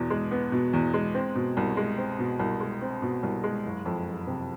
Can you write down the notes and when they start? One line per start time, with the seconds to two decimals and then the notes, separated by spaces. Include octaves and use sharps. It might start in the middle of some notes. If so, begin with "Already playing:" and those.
Already playing: E2 B2
0.10 G#3
0.31 B3
0.52 B2
0.73 E2
0.94 G#3
1.15 C4
1.35 B2
1.57 C2
1.77 G#3
1.98 C4
2.19 B2
2.39 C2
2.60 G#3
2.82 C4
3.02 B2
3.23 C2
3.44 G#3
3.65 F#1
3.85 F2
4.06 F#1
4.27 C3